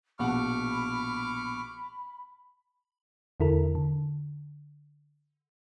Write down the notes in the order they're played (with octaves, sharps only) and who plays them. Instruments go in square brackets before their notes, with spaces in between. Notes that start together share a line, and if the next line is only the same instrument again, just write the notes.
[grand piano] A#1 B2 F#5 [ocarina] B5 [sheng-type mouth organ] C#6 D6 F6
[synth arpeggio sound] E2 D3 E4 A4 A#4
D3